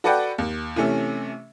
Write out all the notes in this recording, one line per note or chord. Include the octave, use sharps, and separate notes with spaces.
F#4 A4 B4 D5 F#5 G5
D#2
C3 E3 A3 C#4